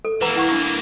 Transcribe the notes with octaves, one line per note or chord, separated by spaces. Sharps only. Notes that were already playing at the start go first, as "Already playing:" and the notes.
A4
E3 A#3 B4 F#5 A#5
E4 F#5 C#6
D4